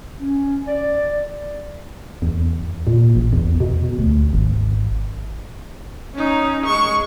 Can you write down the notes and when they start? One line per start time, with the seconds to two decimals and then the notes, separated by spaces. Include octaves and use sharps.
0.18 C#4
0.67 D5
2.22 E2
2.87 A#2
3.15 A1
3.33 E2
3.60 B2
3.99 D2
4.33 G#1
6.15 C#4 D#4
6.66 G#3 C#6